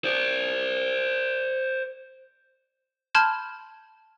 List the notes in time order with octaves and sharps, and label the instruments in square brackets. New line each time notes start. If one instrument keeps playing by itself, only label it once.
[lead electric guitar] C5 D5
[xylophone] A5 B5 C6 F6 G6 G#6